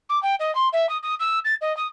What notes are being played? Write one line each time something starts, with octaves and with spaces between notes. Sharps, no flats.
D6
G5
D#5
C6
E5
D#6
D#6
E6
A6
D#5
D#6